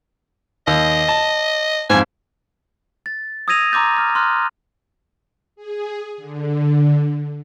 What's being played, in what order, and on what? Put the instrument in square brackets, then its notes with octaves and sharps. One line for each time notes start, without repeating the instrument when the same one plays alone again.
[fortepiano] D#2 [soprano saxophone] D#5
[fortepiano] A5
[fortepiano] F2 G#2 [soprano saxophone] G#5
[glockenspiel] A6
D#6 E6 G#6 A#6 D#7 F7
A#5 C6 D6 E6 G6 A6
F6
C6 F6 F#6
[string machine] G#4
D3